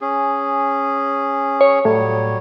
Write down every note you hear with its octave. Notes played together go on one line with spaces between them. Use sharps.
C#4 G#4
C#5
A2 F#3 G3 C#5